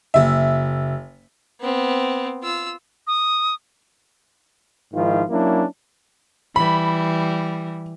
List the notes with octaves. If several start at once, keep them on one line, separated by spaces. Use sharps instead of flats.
F#1 E5
B3 C4
F4 E6
D#6
G#2 D#3 F3 E4 F4
F#3 A#3 C#4 D4 E4
E3 G3 B5